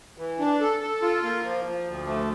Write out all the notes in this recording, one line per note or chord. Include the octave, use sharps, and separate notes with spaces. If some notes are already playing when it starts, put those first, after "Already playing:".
E3
D4
A4
A4
F4
A#3
F3
F3
D2
A3